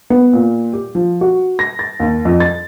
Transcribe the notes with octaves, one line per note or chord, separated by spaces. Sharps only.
B3
A#2
G4
F3
F#4
A#6
A6
D#2
F2
A6